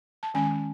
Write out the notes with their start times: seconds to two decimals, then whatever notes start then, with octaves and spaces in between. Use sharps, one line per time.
0.23 A5
0.34 D#3 G#3 C#4 G#5